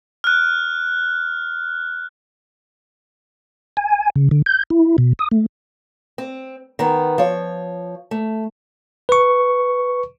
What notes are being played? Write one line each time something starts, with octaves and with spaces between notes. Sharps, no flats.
F6 F#6
G#5
C#3
D3
G6
E4
B2
D#6
A3
C4
D#3 B3
F3 C#5
A3
B4 C#6